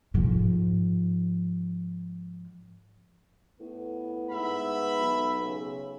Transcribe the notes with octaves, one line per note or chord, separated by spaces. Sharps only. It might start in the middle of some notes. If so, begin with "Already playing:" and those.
G#2 F3
A2 B3
G#2 E5 B5
B1
C#3